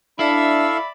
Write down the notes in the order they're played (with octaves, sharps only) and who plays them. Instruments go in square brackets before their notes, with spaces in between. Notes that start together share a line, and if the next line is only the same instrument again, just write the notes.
[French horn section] D4 [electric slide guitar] E4 [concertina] A4 F5 E6 [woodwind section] D5 E5 B5